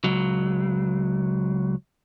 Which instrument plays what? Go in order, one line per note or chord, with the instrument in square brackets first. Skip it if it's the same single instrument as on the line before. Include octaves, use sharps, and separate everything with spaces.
[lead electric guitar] C#2 F#3